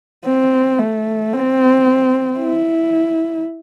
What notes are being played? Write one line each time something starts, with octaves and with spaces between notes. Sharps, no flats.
C4
A3
C4
E4